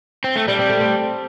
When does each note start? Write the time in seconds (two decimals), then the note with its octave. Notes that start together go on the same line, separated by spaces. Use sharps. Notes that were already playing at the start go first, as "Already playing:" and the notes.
0.24 C4
0.36 A3
0.48 G3 D4
0.59 C4
0.70 A3
0.81 C4